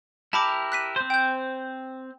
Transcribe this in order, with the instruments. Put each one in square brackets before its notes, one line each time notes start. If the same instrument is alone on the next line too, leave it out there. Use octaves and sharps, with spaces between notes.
[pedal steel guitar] E4 G4 A#4 [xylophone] A5 B5 D6
[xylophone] F#6 B6 D#7
[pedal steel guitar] C4 C5
[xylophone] G5 G6